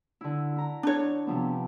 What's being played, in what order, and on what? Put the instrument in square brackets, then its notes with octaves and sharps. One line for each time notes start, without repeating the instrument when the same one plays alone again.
[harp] D3 E4
E4 A#5
[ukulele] D4 C#5
[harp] C3 F3 B3